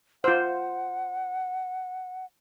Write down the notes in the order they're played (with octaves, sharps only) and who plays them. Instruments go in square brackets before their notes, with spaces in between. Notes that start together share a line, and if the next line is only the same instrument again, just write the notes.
[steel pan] F4 C5 [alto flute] F#5